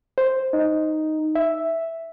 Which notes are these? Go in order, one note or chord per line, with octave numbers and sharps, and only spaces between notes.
C5
D#4
E5